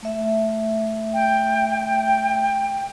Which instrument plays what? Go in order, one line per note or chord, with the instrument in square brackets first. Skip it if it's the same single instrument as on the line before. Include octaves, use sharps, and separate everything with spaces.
[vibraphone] A3 E5
[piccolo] G5